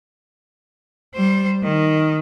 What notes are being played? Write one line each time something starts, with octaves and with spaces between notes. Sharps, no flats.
G3 C5
D#3